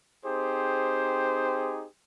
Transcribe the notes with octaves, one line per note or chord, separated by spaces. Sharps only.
C4 D#4 G4 G#4 C5